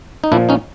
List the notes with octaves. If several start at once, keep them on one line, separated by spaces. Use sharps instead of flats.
D#4
A#2 F3 D4 E4
C#4 D#4